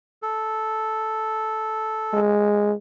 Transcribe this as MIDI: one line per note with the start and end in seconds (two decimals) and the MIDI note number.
0.22 2.20 69
2.13 2.73 56